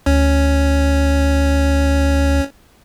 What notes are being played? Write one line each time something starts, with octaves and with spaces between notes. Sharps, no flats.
D2 C#4